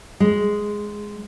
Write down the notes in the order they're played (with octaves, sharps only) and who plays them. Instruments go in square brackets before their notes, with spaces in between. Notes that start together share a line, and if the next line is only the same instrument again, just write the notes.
[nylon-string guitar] G#3